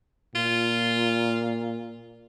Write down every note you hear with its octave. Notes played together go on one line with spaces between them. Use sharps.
A#2 F4